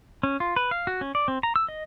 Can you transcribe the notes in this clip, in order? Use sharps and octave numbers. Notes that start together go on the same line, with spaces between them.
C#4
F4
B4
F5
F#4
C#4
D5
C4
A#5
E6
D#5